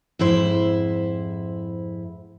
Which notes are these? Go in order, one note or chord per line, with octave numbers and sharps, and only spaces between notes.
F2 G#2 E4 C5